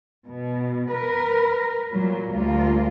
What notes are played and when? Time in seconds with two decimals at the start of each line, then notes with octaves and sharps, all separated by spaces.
0.26 B2
0.90 A#4 B4
1.92 A#2 F#3
2.32 D2 G3 A#3 F4